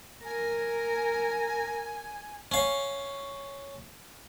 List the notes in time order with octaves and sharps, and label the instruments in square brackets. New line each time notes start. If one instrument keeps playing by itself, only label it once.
[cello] A#4 [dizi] G#5
[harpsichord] C#4 F5